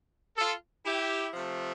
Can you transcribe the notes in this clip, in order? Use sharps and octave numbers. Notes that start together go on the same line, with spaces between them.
F4 A4
E4 G4
C3 F3 A3